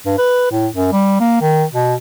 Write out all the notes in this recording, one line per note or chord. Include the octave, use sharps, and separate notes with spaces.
G2
B4
A2
F#2
G3
A#3
D#3
B2